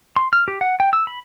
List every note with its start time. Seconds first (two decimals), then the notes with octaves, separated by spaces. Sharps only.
0.16 C6
0.33 F6
0.48 G4
0.61 F#5
0.80 G5
0.93 E6
1.07 B5